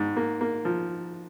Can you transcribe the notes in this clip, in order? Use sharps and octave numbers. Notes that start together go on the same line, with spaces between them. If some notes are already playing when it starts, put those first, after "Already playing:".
Already playing: G#2
A#3
A#3
F3